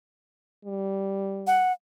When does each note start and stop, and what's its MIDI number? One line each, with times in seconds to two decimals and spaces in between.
0.65 1.68 55
1.47 1.72 78